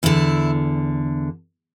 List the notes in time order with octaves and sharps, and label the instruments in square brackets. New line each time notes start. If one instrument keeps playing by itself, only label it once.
[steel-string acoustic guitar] E2 D3 E4